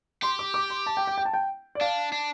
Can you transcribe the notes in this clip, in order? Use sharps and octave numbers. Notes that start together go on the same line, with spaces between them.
G4 C6
D6
D6
C6
A5
G5
G5
G5
A5
G5
D5
D4 F5
D4